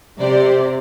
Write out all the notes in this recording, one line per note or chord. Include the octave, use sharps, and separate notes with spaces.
C3 G4 C5 D5